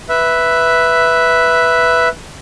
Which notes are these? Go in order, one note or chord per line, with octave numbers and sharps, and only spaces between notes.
B4 E5